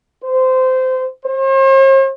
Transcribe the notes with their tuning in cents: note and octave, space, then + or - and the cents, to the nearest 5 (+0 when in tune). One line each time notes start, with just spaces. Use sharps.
C5 -20
C5 +45